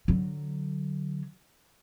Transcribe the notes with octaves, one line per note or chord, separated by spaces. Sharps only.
D3 F#3